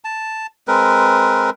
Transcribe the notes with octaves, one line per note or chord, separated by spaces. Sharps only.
A5
G#3 C4 A#4 B4